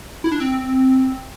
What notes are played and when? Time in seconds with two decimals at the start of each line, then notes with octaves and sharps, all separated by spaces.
0.24 E4
0.32 D4
0.40 C4